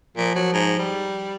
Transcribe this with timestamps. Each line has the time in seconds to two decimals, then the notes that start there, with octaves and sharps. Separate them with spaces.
0.17 A#2 F3
0.35 F#3
0.53 G#2
0.79 G3